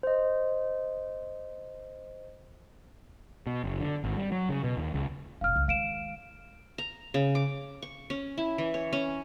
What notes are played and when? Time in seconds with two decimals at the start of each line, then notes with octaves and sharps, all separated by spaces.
0.03 C5 D#5
3.47 B2
3.64 F#1
3.80 D3
4.04 G#1
4.17 G3
4.32 F#3
4.49 C#3
4.64 B2
4.77 D#2
4.94 C#2
5.41 F1 A#1 F5 F6
5.56 C#2
5.68 D#3 G#3 F5 D7 E7
6.78 A#5
7.14 C#3
7.35 D6
7.82 C#6
8.10 C#4
8.38 E4
8.58 E3
8.74 C#5
8.93 C#4